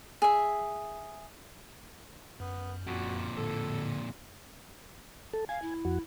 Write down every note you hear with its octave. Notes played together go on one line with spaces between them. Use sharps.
G#4 E5
F#2 B3
F2 A#2 F#4
A2 D3 A4
A4
F5 G#5
E4
F2 F#4